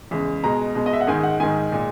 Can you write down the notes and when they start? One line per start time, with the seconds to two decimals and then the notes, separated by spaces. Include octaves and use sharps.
0.11 E2 C#3 G#3
0.44 B2 G#3 A#5
0.75 B2 G#3
0.86 D#5
0.93 E5
1.01 F#5
1.07 G#2 D#3 G#3 G#5
1.23 F#5
1.40 G#2 D#3 G#3 G#5
1.72 A#2 G#3